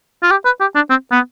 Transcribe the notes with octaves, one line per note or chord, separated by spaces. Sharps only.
F4
G4
B4
G4
D4
C4
B3